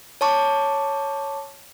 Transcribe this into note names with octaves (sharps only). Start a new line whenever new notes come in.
C#5 A5 C#6 D6